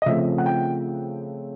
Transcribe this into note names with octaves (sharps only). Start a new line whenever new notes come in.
D#5
C#3 F3 A3 C4 E5
F#5
G5